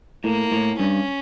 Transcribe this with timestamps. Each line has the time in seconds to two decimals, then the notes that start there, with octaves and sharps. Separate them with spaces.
0.24 A2 A#3
0.52 A2
0.79 G2 C#4